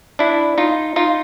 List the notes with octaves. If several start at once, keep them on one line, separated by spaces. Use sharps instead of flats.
D4 E4
D#4 F4
D#4 F4